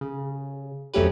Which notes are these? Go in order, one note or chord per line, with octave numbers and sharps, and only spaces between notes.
C#3
F2 F#3 A3 C#4 G4 B4